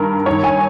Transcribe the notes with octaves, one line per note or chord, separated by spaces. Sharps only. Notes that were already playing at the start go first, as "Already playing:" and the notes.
Already playing: G2 D#3 A#4
G2 D#3 C#5
G#5